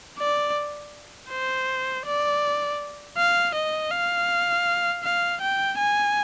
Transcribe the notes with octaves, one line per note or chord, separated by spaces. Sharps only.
D5
C5
D5
F5
D#5
F5
F5
G5
G#5